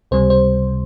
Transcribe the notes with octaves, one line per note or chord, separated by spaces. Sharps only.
C#2 C3 G3 C5
C5